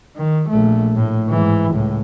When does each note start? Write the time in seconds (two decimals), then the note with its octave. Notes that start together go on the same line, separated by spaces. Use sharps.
0.17 D#3
0.49 A#1 A3
0.96 A2
1.29 G#2 E3
1.71 C#2 A2